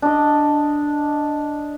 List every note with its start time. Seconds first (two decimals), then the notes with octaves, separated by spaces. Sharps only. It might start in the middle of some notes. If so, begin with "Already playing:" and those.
0.02 D4 D#5